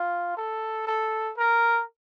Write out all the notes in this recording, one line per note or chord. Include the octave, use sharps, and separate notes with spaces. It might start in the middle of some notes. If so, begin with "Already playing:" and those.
Already playing: F4
A4
A4
A#4